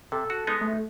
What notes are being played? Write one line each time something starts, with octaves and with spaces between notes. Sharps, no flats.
C3 A4
F#4
G#3 B3 D#4
A3